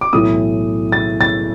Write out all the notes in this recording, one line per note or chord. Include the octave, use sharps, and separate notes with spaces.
D6
B1 A2 E3 A3 D#6
A6
A6